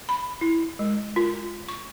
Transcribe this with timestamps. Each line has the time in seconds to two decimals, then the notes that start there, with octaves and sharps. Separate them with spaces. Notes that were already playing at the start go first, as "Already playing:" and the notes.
0.09 B5
0.41 E4
0.79 G#3
1.16 F4
1.69 C#6